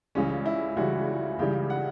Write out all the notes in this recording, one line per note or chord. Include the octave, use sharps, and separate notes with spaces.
C#2 C#3 E3 G3 C#4
E4
C#2 C#3 E3 G3 F#4
C#2 C#3 E3 G3 G4
F#5